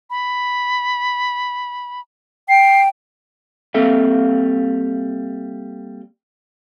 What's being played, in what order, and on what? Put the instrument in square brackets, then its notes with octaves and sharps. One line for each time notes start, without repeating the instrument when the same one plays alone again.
[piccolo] B5
[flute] G5 [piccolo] C7
[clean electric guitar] G3 A#3 C4 A4 E5 F5